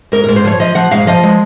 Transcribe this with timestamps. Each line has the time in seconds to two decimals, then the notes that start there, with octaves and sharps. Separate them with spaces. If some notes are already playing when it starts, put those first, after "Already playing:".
0.12 G#2 A#4
0.24 G#2 A#4
0.36 C5
0.45 F3 C#5
0.59 F3 D#5
0.75 F3 F#5
0.91 G#2 F5
1.07 F3 D#5
1.23 G#3